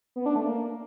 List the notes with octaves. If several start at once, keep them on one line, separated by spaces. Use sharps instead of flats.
B3
D4
A3
A#3